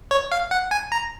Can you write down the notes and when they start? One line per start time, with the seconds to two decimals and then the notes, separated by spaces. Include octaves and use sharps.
0.11 C#5
0.32 F5
0.51 F#5
0.71 G#5
0.92 A#5